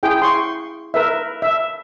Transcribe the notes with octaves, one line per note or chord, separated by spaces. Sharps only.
E4 G#4 G5
C6 C#6
A#4 B4 E5
E5